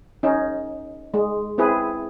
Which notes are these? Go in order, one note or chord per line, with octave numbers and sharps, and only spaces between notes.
C#4 D#4
G#3
C4 E4 G#4 B4